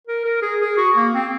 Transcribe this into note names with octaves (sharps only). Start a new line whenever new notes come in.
A#4
A#4
G#4
G#4
F#4
A#3
C4